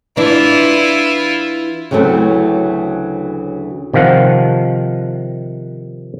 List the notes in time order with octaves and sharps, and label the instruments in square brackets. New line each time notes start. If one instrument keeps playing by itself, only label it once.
[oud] E3 D4 [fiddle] E4 F4
[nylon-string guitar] D2 C#3 E3 F#3 A3 C4
[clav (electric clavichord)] C3 D#3 F3 F5 F#5